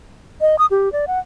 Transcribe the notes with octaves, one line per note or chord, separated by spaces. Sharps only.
D#5
D#6
G4
D5
F#5